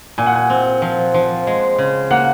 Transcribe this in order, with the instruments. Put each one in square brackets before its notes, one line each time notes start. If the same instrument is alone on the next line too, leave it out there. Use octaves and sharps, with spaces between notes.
[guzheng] A#2 [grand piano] G#5
[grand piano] F#5
G#5
[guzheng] C4
F3
F3
G#3
C#3
[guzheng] A#3 [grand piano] F#5